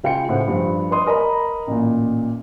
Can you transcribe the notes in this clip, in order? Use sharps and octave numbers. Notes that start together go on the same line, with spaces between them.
C#2 F4 F5 G5 G#5 C#7
A2 C#3 C5 F#5
G2 F3
B4 D#5 C6 D#6
A#4 D#5 A#5 B5
A1 A#2